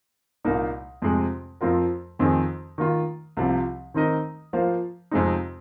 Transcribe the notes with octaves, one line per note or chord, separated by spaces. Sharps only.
C2 A#2 A#3 D#4
F2 C3 G#3
F2 F3 C4 F4 A#4
F2 D#3 C4 D#4 G#4
D#3 A#3 F4
C2 C3 F3
D#3 C4 D#4 A#4 D#5
F3 A#3 F4 C5 F5
F2 C3 G#3 C4 D#4